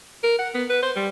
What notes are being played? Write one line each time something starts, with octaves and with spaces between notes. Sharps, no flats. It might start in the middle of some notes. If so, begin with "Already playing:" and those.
A#4
F#5
B3
B4
C5
G3